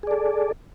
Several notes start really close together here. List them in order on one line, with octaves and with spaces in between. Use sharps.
G#4 D5 A4